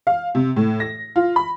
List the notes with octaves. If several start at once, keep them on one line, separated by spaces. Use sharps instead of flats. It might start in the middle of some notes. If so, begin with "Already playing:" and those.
F5
C3
A2
A#6
F4
B5